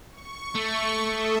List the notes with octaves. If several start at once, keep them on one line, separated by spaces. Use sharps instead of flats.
C#6
A3
A4 E5 D#6